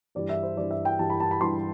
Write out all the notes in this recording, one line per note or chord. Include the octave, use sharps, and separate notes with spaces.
G2 E3 G3 D5
E5
C5
G2 E3 G3 D5
E5
G5
G2 E3 G3 A5
B5
A5
B5
G2 E3 G3 C6